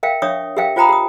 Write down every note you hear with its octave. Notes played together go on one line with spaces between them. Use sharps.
A#4 E5 F5 G5
D4 C#5 E5 C#6 D#6
G4 A#4 E5 F5 G5
F4 C5 G5 A#5 B5 D#6
G4 D#6